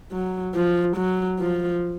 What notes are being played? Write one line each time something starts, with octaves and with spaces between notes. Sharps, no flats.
F#3
F3
F#3
F3